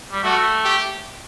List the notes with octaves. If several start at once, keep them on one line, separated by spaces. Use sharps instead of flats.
G3
A3 F#4
G4